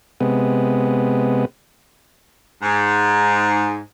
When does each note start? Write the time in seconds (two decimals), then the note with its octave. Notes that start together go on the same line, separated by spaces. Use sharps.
0.21 C3 G#3 B3
2.63 G#2